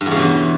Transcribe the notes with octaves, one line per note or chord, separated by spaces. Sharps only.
G2
E2
C#3
B2
E2